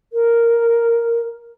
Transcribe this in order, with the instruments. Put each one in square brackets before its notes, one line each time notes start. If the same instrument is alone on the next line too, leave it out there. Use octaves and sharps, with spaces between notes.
[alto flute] A#4